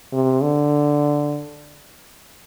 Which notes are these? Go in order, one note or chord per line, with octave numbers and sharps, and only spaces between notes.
C3
D3